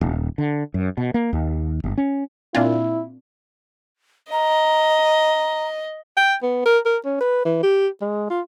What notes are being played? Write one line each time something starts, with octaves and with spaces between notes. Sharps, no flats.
D#1
D3
F#2
B2
A#3
D#2
G1
C#4
A#2 C4 D4 E4 F4
D#5 A#5
G5
B3
A#4
A#4
C#4
B4
E3
G4
G#3
F4